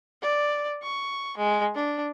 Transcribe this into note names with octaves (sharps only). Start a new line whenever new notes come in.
D5
C#6
G#3
D4